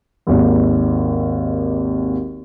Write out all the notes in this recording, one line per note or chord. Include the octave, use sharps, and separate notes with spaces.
G#1 D#2